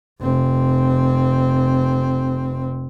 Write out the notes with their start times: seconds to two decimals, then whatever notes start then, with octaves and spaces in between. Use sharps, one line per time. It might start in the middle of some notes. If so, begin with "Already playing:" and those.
0.22 F1 C4